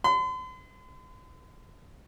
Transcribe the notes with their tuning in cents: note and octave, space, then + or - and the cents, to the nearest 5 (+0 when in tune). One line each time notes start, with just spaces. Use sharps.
C6 -45